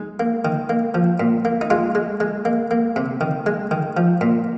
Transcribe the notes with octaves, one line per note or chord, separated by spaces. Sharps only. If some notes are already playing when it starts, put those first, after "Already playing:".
Already playing: G#3 D#4
A#3
D#3
A#3
F3
A#2
A#3
D#4
G#3 F4
G#3
G#3
A#3
A#3
C3
D#3
G#3
D#3
F3
A#2